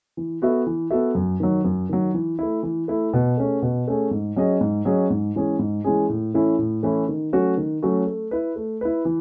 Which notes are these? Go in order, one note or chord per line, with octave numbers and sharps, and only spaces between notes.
E3
B3 F#4 A4 E5
E3
B3 F#4 A4 E5
F#2
D#3 F#3
F#2
D#3 F#3
E3
A3 E4
E3
A3 E4
B2
A3 C#4 G#4
B2
A3 C#4 G#4
G#2
F#3 C#4 G#4 D#5
G#2
F#3 C#4 G#4 D#5
G#2
E3 G#3 C#4 G#4
G#2
E3 G#3 C#4 G#4
A2
E3 A3 C#4 E4
A2
E3 A3 C#4 E4
D#3
F#3 A3 C#4 F#4
D#3
F#3 A3 C#4 F#4
A3
E4 B4
A3
E4 B4
E3